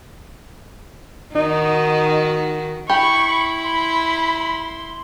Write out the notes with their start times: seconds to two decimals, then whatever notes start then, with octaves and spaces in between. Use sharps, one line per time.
1.35 D#3 D#4 F#4
2.89 E4 G4 B5 C#6
3.64 B5 C6